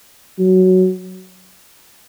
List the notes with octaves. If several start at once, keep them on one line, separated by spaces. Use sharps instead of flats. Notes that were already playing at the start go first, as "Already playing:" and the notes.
F#3